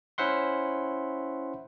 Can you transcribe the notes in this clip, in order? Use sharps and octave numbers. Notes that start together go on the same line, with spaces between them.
C#4 E4 C5 E5 F#5 C6